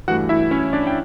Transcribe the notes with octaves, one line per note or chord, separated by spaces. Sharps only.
G2 E3 A3 F#4 F#5
E4 E5
C#4 C#5
D4 D5
G5